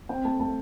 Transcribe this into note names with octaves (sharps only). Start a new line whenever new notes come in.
C4 G5
A3 A5
A3 A5